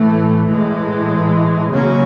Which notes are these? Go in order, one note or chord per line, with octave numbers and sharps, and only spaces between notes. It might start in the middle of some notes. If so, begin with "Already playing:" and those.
Already playing: A2 E3 A3
A2 E3 G#3
C#3 F#3 A#3 C#4